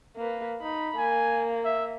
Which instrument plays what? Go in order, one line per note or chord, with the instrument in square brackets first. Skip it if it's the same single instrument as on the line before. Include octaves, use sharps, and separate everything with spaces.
[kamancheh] A#3 B4
[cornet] D#4 [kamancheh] B5
[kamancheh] A#3 [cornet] G#5
[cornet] E5